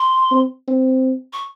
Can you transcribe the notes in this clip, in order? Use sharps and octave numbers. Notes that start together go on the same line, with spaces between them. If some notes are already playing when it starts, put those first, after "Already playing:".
Already playing: C6
C4
C4
C#6